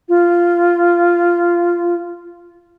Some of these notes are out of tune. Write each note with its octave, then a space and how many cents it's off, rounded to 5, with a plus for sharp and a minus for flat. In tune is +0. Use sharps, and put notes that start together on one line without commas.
F4 -10